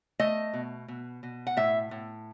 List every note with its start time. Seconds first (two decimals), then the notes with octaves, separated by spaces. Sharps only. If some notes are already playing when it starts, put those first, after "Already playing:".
0.19 A3 D#5
0.53 B2
0.88 B2
1.23 B2
1.47 F#5
1.57 A2 E5
1.91 A2